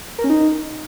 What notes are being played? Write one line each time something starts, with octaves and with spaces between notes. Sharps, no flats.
A#4
C#4
D#4